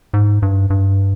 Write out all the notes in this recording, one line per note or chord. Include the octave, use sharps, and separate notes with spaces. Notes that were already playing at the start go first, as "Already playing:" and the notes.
G#2
G2
G2